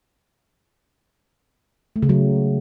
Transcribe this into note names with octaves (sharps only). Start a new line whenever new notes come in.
A3
C#3
F#3